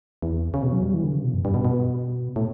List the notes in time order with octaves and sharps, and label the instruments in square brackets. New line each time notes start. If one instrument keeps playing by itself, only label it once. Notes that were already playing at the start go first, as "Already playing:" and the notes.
[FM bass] E2
C#3
B2
F#3
G3
E3
D3
C#3
B2
F#2
G2
B2
B2
A2